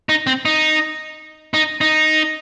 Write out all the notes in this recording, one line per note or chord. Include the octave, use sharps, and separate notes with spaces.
D#4
C4
D#4
D#4
D#4